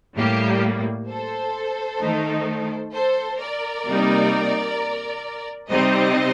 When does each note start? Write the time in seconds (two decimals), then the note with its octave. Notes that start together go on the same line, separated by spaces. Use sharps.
0.16 A2 G3 A#3 G4
1.09 A4 C5
2.01 D#3 A3 D#4
2.94 A4 C5
3.39 A#4 D5
3.86 C3 G3 A#3 D#4
5.70 C3 G3 C4 D#4 C5 D#5